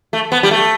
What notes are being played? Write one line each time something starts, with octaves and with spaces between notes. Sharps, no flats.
A3
B3
G3
A3